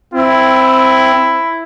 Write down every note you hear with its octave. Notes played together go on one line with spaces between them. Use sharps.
C4 E4